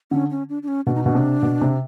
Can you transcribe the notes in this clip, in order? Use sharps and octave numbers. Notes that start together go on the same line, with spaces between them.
D3 C#4
C#4
D4
D4
C#4
B2 D4
D#4
B2 D4
C3
B2
C3